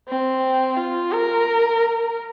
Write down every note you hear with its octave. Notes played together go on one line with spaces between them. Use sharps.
C4
F4
A#4